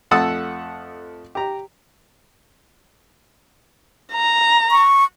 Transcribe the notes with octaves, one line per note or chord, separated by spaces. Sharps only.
F2 A3 F#5 A5 D#6 E6
G4 A#5
A#5
C#6